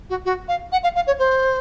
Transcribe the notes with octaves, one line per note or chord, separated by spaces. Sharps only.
F#4
F#4
F5
F#5
F5
F5
C#5
C5